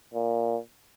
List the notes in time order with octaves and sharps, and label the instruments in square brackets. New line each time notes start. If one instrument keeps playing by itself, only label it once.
[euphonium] A#2